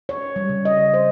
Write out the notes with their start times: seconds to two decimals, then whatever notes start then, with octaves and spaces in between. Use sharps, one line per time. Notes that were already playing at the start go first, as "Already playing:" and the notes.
0.09 C#5
0.36 G3
0.49 C#3
0.65 D#5
0.94 C5